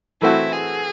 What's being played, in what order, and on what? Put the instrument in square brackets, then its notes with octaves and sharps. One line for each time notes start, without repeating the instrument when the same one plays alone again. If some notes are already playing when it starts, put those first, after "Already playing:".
[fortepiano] E3 A3 C4 F#4 [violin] E4
[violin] G#4